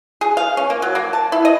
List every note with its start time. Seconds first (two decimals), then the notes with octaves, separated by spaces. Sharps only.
0.21 G#4
0.37 F5
0.57 C#4
0.70 A#3
0.82 F#3
0.95 A#3
1.13 A5
1.32 E4
1.45 D#5